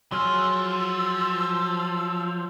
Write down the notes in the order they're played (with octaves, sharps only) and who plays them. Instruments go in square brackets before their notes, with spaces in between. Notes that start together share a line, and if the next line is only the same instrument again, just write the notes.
[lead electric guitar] F3 [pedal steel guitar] F#3 G#4 F6 [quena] E6